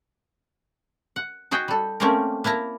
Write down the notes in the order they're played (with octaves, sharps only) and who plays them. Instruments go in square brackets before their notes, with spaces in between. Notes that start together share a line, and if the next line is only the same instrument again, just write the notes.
[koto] F#5
D#4 F#4 G#4 G5
G3 A4
A3 A#3 C4 C#4 G4 A#4
A#3 E4 A5 A#5